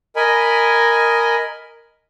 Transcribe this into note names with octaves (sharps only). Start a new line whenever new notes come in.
A#4 D#5 G#5 B5